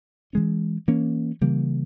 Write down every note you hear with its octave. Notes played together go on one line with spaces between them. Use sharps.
E3 G#3 C#4
E3 A#3 C#4
C#3 E3 G3 A#3